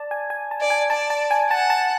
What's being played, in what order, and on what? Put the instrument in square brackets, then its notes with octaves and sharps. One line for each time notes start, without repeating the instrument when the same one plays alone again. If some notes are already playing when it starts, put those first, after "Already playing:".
Already playing: [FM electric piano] D5 A5
G#5
G#5
A5
[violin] D5
[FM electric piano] G#5
[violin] D5 [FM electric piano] A5
[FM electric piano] A5
G#5
[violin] F#5 [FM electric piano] A5
[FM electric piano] A5